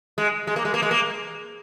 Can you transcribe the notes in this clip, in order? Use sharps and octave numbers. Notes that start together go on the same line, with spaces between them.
G#3
G#3
A#3
G#3
A#3
G#3
A#3